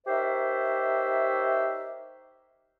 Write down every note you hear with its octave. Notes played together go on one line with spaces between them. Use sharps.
D#4 G4 A#4 C5 C#5 E5